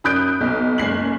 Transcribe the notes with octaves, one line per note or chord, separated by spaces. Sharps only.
F#2 B5 D#6 F#6 G6 D7
B1 B2
F#1 G#3 C7 F#7